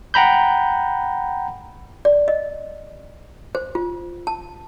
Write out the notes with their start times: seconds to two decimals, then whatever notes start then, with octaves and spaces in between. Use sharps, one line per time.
0.14 F#5 G5 A#5 B5 G6
2.05 D5
2.28 D#5
3.55 C5
3.75 F4
4.27 A5